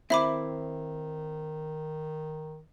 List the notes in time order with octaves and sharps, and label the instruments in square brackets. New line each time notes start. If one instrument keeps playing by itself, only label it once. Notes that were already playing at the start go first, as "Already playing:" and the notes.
[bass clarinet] D#3 [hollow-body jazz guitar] C4 E4 [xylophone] E5 B5 D6